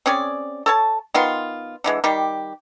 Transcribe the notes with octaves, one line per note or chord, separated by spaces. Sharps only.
C4 C#4 G#4 D5
A4 C#5 A5
D#3 B3 F4 C6
D3 E3 G#3
D#3 G3 G4